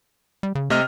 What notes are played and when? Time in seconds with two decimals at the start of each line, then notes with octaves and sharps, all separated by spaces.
0.43 G3
0.55 C#3
0.70 C3 A3 D#5 F6